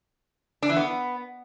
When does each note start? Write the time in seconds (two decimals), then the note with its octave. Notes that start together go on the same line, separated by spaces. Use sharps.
0.62 D4
0.69 E3
0.76 B3